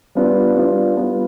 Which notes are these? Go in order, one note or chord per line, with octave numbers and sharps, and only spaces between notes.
G3 B3 D4 F4
G3 B3 D4 F4
G3 B3 F4